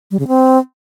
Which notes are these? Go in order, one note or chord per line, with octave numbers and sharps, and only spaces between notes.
G3
C#3
C4